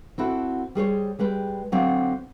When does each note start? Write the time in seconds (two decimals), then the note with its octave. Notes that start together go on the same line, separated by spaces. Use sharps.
0.18 C4 E4 F#4 A4
0.75 G3 G#4 C5 C#5
1.19 G3 G#3 B4 G5
1.72 D3 F#3 C4 F5